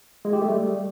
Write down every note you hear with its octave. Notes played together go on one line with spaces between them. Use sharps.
G#3
G4
A3
G3